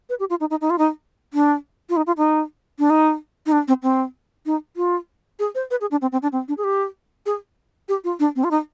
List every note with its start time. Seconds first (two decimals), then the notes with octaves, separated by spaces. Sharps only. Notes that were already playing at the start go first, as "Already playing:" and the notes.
0.09 B4
0.19 G4
0.30 F4
0.40 D#4
0.50 D#4
0.61 D#4
0.70 F4
0.78 D#4
1.34 D4
1.89 F4
1.96 D#4
2.07 F4
2.17 D#4
2.79 D4
2.90 D#4
3.46 D#4
3.52 D4
3.68 C4
3.83 C4
4.46 D#4
4.76 F4
5.39 G#4
5.55 C5
5.70 B4
5.81 G#4
5.91 D4
6.01 C4
6.12 C4
6.22 D4
6.32 C4
6.48 D4
6.57 G#4
6.64 G4
7.26 G#4
7.89 G4
8.04 F4
8.19 D4
8.36 C4
8.44 F4
8.51 D#4